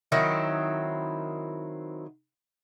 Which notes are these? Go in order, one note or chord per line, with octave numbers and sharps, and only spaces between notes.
D#3 F#3 C4 E4